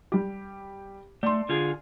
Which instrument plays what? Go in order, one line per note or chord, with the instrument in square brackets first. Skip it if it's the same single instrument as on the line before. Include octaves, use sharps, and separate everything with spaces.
[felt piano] G3 G4
[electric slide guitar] A3 [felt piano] D5 C6
[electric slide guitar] D3 F4 G#4